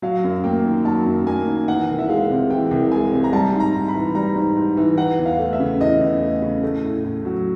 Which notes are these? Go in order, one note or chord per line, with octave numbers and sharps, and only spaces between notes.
F#3 F5
F#2
A#3 G5
D#3
F#3 A5
F#2
A#3 G#5
D#3
E3 F#5
C2
E5
G#3 F5
C3
E3 G5
C2
G#3 G#5
C3
A#5
G3 A5
G#2
A#5
G#2
B5
E3
G3 A#5
G#2
G#2
E3
E3 F#5
E2
F5
A3
E5
C#3
E3 D#5
E2
A3
C#3
A3
A2
A2
F#3